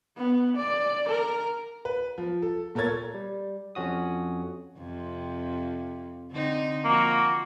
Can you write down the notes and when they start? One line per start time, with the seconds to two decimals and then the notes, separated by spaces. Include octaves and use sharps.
0.17 B3
0.57 D5
1.08 A#4
1.85 B4
2.18 F3
2.42 A4
2.75 A#2 A4 A#4 C#5 G#6 A6
3.14 G3
3.75 F2 C#4 F#4 D#6
4.78 F2 C3
6.31 D3 C4 D#4
6.85 F3 A#3 F#4